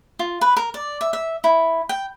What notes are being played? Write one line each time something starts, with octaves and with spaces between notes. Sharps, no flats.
F4
B4
A#4
D5
E5
E5
E4
G5